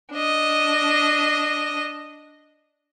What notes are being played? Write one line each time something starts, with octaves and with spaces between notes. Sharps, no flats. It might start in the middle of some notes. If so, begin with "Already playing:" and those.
D4 D#5